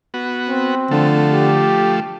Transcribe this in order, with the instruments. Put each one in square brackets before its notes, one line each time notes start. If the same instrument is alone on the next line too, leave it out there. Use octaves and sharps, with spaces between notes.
[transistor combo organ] B3 F#4
[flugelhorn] C4
[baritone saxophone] D3 [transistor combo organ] F3 A3
[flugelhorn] G4